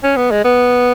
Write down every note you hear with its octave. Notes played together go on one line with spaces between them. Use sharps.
C#4
B3
G#3
B3